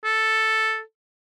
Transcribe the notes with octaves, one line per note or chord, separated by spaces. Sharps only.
A4